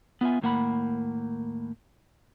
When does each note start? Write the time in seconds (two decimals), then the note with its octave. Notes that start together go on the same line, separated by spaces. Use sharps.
0.21 B3 F4 E5 G#5
0.41 D#2 A2 A#3 F#5 B5